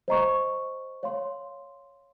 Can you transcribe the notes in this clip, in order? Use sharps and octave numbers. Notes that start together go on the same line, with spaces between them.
C5 D#5 A#5 C#6
C#5 F5 C6